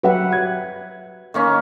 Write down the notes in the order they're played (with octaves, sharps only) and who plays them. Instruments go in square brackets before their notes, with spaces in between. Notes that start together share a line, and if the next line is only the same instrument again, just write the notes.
[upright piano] F#3 G4 E5 [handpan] B4 F#5
[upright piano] G#6
[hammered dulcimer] D#3 A#3 C#4